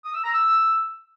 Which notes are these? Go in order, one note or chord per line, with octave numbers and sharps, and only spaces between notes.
D#6
E6
A#5
E6